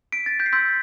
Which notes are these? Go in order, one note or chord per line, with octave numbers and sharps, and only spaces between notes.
B6 D7
A6
G6 B6
C7
C6 E6 G6 B6